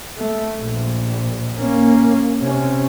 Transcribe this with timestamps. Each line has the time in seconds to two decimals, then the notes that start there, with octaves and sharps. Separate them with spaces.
0.18 A3
0.61 A#1
1.59 A#3 C#4
2.41 C3 C#4